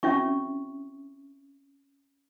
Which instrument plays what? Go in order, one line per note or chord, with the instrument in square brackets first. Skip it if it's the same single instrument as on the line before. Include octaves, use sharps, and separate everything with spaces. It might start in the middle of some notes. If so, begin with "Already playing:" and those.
[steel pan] C4 E4 F#4 [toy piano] C#4 E5 C#6